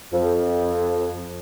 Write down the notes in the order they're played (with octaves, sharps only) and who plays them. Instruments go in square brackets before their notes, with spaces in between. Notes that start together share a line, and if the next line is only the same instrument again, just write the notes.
[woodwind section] F2